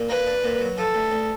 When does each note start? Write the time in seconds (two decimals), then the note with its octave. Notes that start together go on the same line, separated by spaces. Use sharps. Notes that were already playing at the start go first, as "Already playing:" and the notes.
Already playing: A#2
0.09 A#3 B4
0.27 D4
0.44 A#2
0.61 F#3
0.77 F3 A4
0.95 D2
1.12 D2